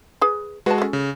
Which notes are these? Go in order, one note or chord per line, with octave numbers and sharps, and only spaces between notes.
G#4 B4
G#3 F#4 B4 A5
C#4 A4
C#3